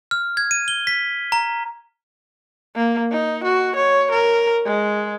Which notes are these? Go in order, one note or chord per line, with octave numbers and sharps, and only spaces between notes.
F6
G#6
D#7
G7
B6
A#5
A#3
D#4
F#4
C#5
A#4
G#3